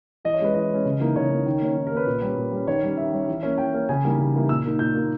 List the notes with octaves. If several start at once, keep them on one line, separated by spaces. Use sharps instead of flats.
E3 D#5
C#5
G#3 C#4 B4
E3 D#5
G#3 C#4
C#3
E3 A#3 D#4
C#3 C#5
E3 A#3 D#4
D#3
A#3 C#4
D#3
A#4
A#3 C#4 B4
A#2
G3 C#4
A#2
G3 C#4
D#3 C#5
G3 C#4
D#3 E5
G3 C#4
E3
A#3 C#4
E3 G5
A#3 C#4
C#3 G#5
E3 G3 A#3 D#4
C#3
E3 G3 A#3 D#4
A#2 E6
A#3 D#4
A#2 G6
A#3 D#4